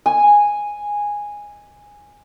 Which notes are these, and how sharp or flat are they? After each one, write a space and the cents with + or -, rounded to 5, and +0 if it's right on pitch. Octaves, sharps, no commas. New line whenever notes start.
G#5 -10